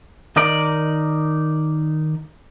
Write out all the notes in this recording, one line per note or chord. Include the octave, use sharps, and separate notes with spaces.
D#3 D#4 A#4 D5